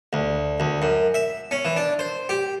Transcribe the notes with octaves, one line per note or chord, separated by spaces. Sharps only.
D2
D2
F#2
E5
C#4
E3
D4
C5
G4